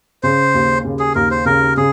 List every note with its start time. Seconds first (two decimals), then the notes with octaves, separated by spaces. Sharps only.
0.23 C#3 C5
0.54 D#2
0.85 C#3
0.99 G#4
1.15 D#2 A#4
1.31 C5
1.45 C#3 A#4
1.77 C#3 G#4